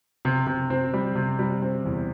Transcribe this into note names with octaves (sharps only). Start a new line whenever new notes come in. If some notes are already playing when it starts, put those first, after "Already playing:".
C3
C3
C4
G3
C3
G3
C4
E2